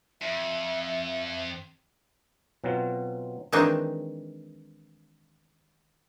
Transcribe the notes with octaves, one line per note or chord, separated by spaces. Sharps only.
F2 E5
B2 F#3 C4 F4
D#3 E3 G#3 C4 D4 D#4